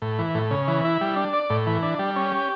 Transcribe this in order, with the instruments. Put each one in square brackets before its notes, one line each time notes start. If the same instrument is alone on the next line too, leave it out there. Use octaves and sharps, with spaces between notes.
[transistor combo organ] A2
E3
A2
C#3
E3
E4
G3
D4
D5
A2
E3
D4
G3
C#4
G4